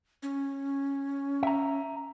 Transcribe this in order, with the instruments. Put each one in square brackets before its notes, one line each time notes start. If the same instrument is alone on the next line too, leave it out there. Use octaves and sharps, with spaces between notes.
[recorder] C#4
[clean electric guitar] E5 A#5